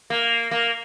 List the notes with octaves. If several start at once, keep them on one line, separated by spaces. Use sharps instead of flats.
A#3
A#3